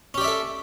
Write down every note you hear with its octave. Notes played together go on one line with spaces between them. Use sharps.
C#4 G4 A4 D5 E5